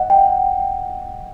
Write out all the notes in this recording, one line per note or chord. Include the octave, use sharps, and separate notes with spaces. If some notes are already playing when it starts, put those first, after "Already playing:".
Already playing: D#5 F#5
G5